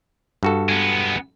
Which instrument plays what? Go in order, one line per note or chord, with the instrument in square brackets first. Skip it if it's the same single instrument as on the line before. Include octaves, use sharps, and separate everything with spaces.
[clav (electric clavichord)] G2 F#4 A4
[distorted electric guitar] G#3 B3